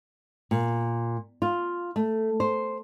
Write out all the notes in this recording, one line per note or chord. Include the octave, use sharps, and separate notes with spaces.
A#2
F4
A3
C5